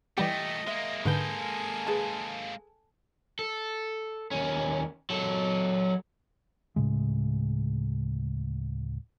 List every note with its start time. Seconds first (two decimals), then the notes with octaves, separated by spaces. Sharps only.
0.18 A#2 E3 G3 A3 G4 D#5 G5
0.67 G#3 A#3 E5
1.05 G#2 D3 A4 B4 G#5 G6
1.87 G#4 B4 A5
3.39 A4
4.31 D#2 C#4
5.10 F#3 A4
6.76 D1 A2 C#3 G#3